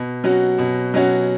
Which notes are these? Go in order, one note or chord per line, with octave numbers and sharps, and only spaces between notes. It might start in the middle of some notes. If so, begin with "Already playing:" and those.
Already playing: B2
F#3 C#4 F#4
B2
F#3 C#4 F#4